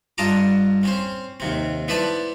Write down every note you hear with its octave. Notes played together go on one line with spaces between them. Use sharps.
G2 F4 D#5 A5 A#5 D6
C4 C#4 C5
D#2 C3 C4
B3 E4 B4 C5 D5 A5